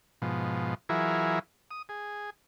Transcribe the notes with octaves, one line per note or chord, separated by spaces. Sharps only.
G#2 B2 F3
E3 F#3 E4 F4 G#4 A#4
D#6
G#4